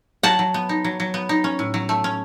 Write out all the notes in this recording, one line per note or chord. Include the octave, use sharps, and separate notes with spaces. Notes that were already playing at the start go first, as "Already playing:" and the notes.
F#3 F#5 A5
F#3
B3
D#4
F#3
F#3
B3
D#4
C#4
A2
F#3
A3
C#4